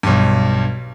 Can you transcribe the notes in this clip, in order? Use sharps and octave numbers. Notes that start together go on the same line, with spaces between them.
B1 G2